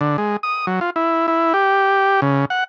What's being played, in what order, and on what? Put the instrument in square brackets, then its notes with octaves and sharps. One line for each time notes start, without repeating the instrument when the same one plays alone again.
[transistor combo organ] D3
G#3
D#6
F#3
F4
E4
E4
G4
C#3
F#5